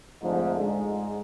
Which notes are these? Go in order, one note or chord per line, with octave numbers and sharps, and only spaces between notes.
F2 G#2 D3 F3 A3
G#2 G#3